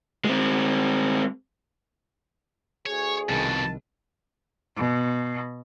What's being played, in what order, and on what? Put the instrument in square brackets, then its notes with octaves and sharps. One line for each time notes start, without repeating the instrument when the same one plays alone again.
[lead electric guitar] G#3 C4
[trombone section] D2 G#4 [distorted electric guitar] C#5
[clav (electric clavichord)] C2 D#3 [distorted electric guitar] F2 B2 [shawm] A5
[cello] B2